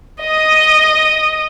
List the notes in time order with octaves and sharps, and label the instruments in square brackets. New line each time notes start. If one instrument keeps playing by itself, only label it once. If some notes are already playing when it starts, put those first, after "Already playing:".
[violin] D#5 D#6